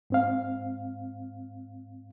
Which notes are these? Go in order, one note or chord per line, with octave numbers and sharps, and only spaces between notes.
G#2 C4 F5